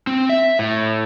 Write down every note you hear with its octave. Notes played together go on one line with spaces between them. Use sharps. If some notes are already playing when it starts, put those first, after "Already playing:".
C4
E5
A2